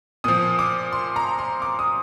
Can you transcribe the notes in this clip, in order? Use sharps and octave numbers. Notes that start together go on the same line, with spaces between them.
A#2 F3 D#6
D6
C6
A#5
C6
D6
D#6